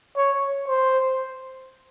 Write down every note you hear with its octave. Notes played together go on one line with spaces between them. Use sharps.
C#5
C5